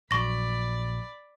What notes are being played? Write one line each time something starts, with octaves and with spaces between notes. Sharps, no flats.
A#1 F#3 D5 B5 C#6 A#6